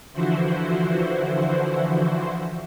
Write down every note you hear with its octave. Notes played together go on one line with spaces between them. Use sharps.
D3 E3 F3 E4 F#4 C5